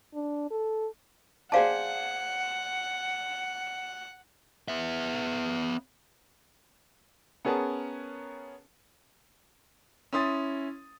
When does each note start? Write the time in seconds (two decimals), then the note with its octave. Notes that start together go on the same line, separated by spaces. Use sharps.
0.15 D4
0.51 A4
1.52 G#4 C5 D5 F5 F#5 A5
4.68 B3 E5
7.45 B3 C#4 G#4 A#4 A5
10.13 C#4 E4 C6 D#6 A6